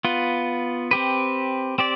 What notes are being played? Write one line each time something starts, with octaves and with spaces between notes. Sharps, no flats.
B3 F4 B4
C4 G4 B4
C4 G4 D5